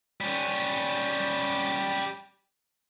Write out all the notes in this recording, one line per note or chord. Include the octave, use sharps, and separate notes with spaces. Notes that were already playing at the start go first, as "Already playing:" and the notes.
G3 C#4